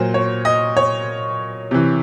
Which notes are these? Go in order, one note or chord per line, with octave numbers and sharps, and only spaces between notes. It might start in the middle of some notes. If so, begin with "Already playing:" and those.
Already playing: A#2 F#3 C5
C#5
D#5
C#5
C3 E3